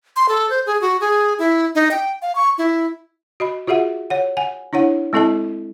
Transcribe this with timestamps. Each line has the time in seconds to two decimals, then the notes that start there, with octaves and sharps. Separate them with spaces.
0.16 C6
0.29 A4
0.50 C5
0.66 G#4
0.81 F#4
1.01 G#4
1.39 E4
1.75 D#4
1.91 G5
2.22 F5
2.35 C#6
2.58 E4
3.40 F#4 D#5 B5
3.67 F4 F#4 G#4 E5 F#5
4.10 C#5 F#5
4.37 F#5 G#5
4.73 D4 E4 C#5 F#5
5.13 G#3 C4 E4 A4 D#5 A5